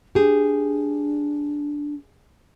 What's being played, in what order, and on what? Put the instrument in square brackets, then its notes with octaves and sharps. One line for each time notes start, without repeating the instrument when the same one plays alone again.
[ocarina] D4 [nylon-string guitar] G4 G#4